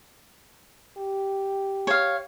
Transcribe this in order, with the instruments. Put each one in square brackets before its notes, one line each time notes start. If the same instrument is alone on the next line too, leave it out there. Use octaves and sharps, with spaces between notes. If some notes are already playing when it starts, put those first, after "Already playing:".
[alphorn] G4
[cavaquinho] C#5 F5